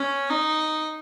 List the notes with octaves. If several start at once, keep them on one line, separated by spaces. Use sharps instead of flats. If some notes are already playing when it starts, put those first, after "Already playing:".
Already playing: C#4
D#4